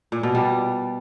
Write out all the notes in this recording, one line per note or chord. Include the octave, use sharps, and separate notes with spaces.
A#2
B2
G3